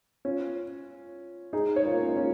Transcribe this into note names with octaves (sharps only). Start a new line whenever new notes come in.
C#4 F4
D#4 G#4
C#5
F4 A#4
A#3
C#4
D#4
C#4 F4